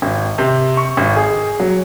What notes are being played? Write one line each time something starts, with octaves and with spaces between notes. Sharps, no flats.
G#1
C3
C#6
G#1
G#4
F#3